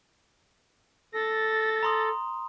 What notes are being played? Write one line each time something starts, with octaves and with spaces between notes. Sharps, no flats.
A4 A6 A#6
A#5 C6 D#6